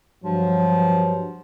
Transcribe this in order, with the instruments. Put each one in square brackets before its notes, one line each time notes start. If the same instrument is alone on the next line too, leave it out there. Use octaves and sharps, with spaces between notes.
[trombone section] G2 F#3 [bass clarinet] F3